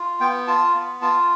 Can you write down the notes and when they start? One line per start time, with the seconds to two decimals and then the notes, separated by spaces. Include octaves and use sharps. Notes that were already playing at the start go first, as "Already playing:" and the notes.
Already playing: F4
0.20 B3 G5
0.48 F4 A5
0.75 B3
1.02 F4 A5